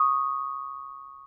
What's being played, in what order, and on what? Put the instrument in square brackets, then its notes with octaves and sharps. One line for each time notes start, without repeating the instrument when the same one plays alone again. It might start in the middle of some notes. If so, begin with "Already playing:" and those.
Already playing: [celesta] C#6 D#6